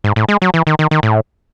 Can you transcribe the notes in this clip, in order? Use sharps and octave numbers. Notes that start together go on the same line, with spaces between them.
G#2
A2
G#3
F#3
E3
D#3
D#3
D#3
A2